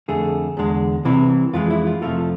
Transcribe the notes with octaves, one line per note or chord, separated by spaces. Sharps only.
F2 D3 A3 G#4
E2 D3 G#3
C2 C3 E3
F2 E3 G#3 F4
E4
F4
F2 C3 F3 A3 F4